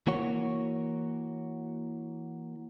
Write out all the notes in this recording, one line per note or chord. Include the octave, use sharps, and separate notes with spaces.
E3 A#3 F#4 C#5